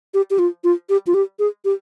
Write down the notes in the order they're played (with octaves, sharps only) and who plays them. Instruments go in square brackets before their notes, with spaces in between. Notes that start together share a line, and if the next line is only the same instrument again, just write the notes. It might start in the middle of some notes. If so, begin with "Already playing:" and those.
[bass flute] G4
G4
F4
F4
G4
F4
G4
G#4
G4